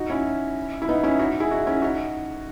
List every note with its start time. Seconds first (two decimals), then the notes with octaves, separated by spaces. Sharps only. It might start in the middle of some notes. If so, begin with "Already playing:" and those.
Already playing: D#4 F#4
0.10 C#4 E4
0.82 E4
0.89 B3 D#4
1.03 C#4 E4
1.19 D#4 F#4
1.40 E4 G#4
1.51 D#4 F#4
1.67 C#4 E4
1.82 D#4 F#4